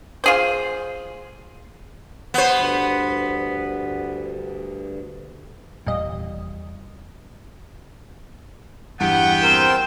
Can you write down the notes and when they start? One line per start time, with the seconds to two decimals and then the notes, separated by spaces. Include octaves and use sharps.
0.24 F4 G#4 C5
2.34 B3 C5 F#5
2.52 D2 G2
5.87 F1 E2 A#2 G3 D#5
9.00 E2 G2 B3 B4 F#5 G5
9.43 C4 A#4 C5 E7